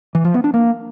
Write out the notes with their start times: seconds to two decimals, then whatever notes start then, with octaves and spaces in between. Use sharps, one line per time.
0.15 E3
0.24 F3
0.34 B3
0.44 D4
0.54 A#3